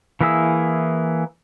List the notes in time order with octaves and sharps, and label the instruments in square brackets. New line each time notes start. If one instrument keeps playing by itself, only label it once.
[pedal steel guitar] E3 A#3 E4 G#4 E6